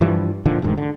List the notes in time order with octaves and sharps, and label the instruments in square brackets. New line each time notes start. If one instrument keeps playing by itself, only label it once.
[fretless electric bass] G2 E3 F3 G3
A#2 D3 D#3 F3
E1 D2 G#2 D#3
D3